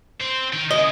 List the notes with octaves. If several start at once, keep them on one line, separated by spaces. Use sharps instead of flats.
C4 C5
D#3 G5
C#3 E4 D#5